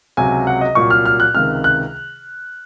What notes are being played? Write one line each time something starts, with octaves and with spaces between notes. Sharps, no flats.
C#2 C3 F#3 G#5
F#5
D#5
C2 A#2 F#3 C#6
F6
F6
F#6
C#2 C3 D#3 F6
F#6